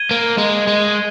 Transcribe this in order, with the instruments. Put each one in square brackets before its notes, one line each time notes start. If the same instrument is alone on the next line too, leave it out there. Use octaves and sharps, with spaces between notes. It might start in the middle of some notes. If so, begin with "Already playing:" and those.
Already playing: [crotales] G#6 D#7 G7
[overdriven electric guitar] A#3
G#3
G#3